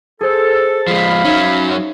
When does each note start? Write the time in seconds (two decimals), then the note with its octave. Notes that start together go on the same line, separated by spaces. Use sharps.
0.21 G#4 A4 C5
0.88 F3 G#3 F5 B5
1.25 F#3 C#4 D#4 E5